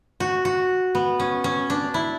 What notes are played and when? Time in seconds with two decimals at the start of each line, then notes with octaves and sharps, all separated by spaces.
0.20 F#4
0.45 F#4
0.95 B3
1.20 C#4
1.44 C#4
1.70 D4
1.94 E4